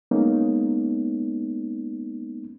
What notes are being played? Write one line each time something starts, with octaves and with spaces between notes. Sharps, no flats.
G#3 A#3 B3 C#4 D#4